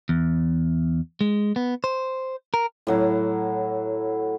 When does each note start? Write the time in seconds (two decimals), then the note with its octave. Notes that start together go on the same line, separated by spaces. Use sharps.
0.09 E2
1.21 G#3
1.56 B3
1.84 C5
2.54 A#4
2.87 A2 F#3 E4